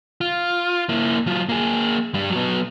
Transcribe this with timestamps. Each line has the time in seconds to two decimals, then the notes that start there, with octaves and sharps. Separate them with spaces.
0.21 F4
0.89 A#3 E4
1.27 F#3 F4
1.49 A#3 G#4
2.14 G2 G3
2.31 F#3 B3